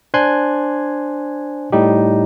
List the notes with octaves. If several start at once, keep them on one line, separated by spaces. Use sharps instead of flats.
D4 C5 G#5 C6 F#6 G#6
A2 G3 D#4 G4